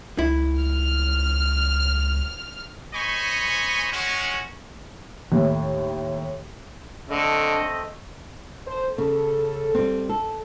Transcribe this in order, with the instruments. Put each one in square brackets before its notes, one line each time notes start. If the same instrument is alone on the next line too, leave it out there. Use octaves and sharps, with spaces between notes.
[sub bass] C#2 [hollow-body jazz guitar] E4
[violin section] F6
[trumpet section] C5 C#5 D#5 G#5 B5 C#6
G#3 C#4 F#4
[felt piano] D#2 A2
[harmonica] D3 [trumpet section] A3 C4 D#5
[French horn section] A4 C5
[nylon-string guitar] C#3 [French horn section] A4
[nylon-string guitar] G3 C4
A4